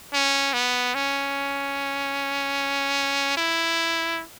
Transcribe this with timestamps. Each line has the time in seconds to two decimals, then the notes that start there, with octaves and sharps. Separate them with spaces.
0.13 C#4
0.53 B3
0.95 C#4
3.37 E4